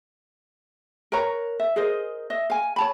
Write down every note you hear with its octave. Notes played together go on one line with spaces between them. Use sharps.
A#4 B4 C#5 A#5
E5
G#4 A#4 C5 D#5
D#5 E5
F5 G#5
C#5 A5 B5